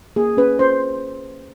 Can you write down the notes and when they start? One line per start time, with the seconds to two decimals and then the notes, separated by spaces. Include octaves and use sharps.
0.16 A#3 G#4
0.37 C#4 B4
0.59 C#4 C5